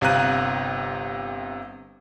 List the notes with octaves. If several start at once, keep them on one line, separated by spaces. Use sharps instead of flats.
G1 C3 F5 A#5 F#6 D#7